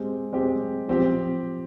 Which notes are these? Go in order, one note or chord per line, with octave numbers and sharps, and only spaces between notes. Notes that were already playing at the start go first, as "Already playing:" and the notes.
Already playing: G#3 C4 G4
G#3 C4 G4
F3 C4 G4